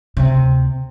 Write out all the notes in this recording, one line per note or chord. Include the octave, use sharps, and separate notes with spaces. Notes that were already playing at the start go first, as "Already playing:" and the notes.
D2 C3